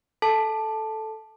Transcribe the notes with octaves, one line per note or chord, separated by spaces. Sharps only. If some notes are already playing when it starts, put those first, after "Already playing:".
A4 A5